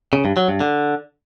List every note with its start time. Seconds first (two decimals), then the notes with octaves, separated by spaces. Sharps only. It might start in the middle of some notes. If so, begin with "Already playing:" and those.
0.13 C#3
0.25 G2
0.37 F#3
0.49 G2
0.60 D3